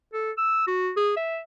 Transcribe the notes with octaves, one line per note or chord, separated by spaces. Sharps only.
A4
E6
F#4
G#4
E5